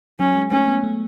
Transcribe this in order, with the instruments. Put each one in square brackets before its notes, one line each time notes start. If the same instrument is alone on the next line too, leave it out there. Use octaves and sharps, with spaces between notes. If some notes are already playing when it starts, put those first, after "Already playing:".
[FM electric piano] F#3 [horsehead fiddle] C#4
[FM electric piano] G#3
[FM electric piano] A3 [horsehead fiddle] C#4
[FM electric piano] B3
A3